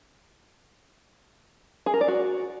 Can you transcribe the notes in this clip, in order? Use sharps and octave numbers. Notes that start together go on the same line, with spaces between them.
G#4
A#4
D5
F#4